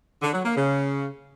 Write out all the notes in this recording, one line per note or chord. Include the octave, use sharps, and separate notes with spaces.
D3
F#3
A#3
C#3